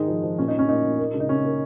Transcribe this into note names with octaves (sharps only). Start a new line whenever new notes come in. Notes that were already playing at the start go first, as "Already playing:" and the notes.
Already playing: G#2 D#3 G#3 D#4
F3
F3
A#2 C#4
D#4
A#2
C#4
A#2 D#4
A#2
A#3
C#3
D#4
C#3 C#4
A#3